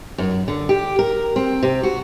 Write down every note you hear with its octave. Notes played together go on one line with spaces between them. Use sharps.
F#2
D3
G4
A#4
C4
C3
F#4